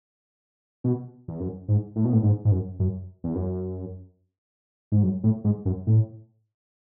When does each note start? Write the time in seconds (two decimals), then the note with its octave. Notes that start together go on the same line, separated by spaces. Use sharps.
0.84 B2
1.28 E2
1.40 F#2
1.68 G#2
1.96 A2
2.05 B2
2.13 A2
2.23 G#2
2.45 G#2
2.51 F#2
2.79 F#2
3.24 E2
3.35 F#2
4.92 G#2
5.03 F#2
5.24 A2
5.44 G#2
5.65 F#2
5.87 A2